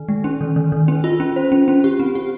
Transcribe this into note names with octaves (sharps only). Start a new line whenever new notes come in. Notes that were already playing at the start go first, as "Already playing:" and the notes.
Already playing: D#3
G#3
C#4
D#3
D#3
D#3
C#4
F4
C#4
C5
C#4
C#4
G4
C4
G4